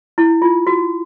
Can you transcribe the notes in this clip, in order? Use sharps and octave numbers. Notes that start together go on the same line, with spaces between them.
E4
F4
F#4